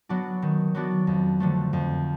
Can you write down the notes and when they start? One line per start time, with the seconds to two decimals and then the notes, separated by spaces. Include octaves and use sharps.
0.09 F#3 B3 D4 F#4
0.42 D#3
0.74 F#3 B3 D4 F#4
1.07 F2
1.40 D3 F3 A3
1.73 F2